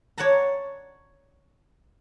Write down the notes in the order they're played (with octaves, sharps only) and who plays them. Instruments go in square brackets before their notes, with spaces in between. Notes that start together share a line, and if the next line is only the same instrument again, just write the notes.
[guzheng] C#5 D5 F#5 A5 A#5